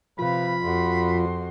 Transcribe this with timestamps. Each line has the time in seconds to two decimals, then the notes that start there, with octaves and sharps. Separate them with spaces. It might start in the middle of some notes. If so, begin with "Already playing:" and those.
0.19 C3 F3 F4 B4 F5 B5
0.63 F2 F#4 C6